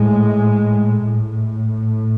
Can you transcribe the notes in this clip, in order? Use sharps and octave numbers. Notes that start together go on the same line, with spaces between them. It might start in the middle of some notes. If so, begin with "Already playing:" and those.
Already playing: A2 G#3
A2